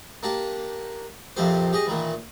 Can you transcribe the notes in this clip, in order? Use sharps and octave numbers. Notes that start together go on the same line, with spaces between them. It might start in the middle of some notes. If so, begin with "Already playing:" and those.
A#3 D4 G4
A#1 F2 C3 F3 G4 C5
G4 G#4 D#5
A#2 D#3 E3